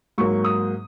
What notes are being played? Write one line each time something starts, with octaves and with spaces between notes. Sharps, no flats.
G#2 F#3 A#3 C#6
D#6